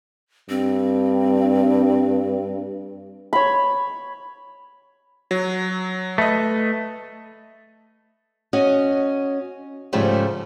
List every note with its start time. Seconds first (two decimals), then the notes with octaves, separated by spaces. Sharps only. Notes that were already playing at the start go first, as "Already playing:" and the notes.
0.49 G2 C4
3.33 C#5 B5
5.31 F#3
6.18 A3 B4 D#5
8.53 C#4 F#4 D#5
9.93 G#2 C#3 F3 G3 A3